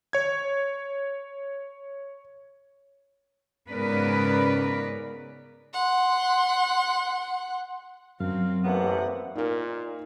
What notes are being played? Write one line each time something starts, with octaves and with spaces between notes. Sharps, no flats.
C#5 G#6
G#2 C#3 B3 A#4 B4 D5
F#5 C6
F#2 F#3 C4 F5
A1 C3 A#3 B3 F#5
A#2 D#4 A#4